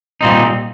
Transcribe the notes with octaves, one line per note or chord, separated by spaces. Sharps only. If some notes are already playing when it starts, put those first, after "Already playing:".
A#2 G3 C4 D#4